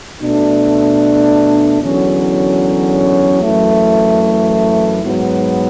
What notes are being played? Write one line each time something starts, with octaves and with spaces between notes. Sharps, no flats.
B2 A3 D4
E2 D3 F#3 C#4
F#2 E3 A3
G#2 F#3 B3